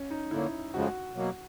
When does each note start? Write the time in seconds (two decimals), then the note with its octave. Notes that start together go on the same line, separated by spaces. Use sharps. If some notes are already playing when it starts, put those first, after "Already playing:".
Already playing: C#4
0.10 D#4
0.31 D3 F#3 A#3 E4
0.74 F2 C#3 F3 G#3 F#4
1.15 B2 F#3 A#3